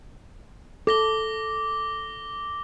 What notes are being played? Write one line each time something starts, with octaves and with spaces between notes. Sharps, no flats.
A4 D6 A#6 G7